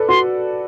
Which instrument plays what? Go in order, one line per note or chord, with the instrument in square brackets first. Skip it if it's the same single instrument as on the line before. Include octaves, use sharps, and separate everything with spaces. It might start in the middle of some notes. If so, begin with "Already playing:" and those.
Already playing: [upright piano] A4 B4 D5
[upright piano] F#4 [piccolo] C6